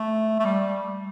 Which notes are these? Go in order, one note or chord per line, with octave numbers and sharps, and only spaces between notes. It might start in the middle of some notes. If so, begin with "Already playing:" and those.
Already playing: A3
A3
G3